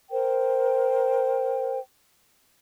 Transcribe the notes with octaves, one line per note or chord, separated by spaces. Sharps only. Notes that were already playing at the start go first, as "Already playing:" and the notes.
A#4 C5 G5